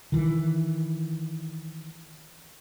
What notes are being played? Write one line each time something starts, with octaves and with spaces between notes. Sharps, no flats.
D#3 E3